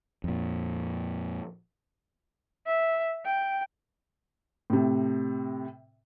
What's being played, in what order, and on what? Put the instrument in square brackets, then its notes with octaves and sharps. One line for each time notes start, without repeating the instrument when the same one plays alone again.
[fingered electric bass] F2 A#2
[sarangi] E5
G5
[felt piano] A2 C3